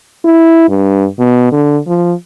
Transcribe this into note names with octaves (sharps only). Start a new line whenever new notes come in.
E4
G2
B2
D3
F3